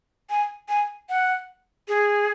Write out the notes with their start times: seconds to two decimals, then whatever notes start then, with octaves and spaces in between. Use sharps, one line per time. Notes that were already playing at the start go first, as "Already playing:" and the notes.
0.30 G#5
0.69 G#5
1.09 F#5
1.88 G#4